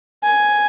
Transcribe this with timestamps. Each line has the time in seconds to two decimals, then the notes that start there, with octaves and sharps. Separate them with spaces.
0.24 G#5